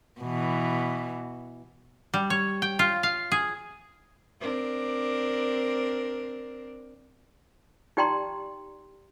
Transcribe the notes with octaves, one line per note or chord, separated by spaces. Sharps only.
B2 E3
G3
C#5
G5
F4
F5
G#4
C4 D4 A#4
D#4 G4 D5 G5 A#5 C6